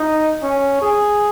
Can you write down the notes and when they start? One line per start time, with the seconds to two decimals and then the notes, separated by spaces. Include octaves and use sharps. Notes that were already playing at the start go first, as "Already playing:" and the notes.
Already playing: D#4
0.43 C#4
0.82 G#4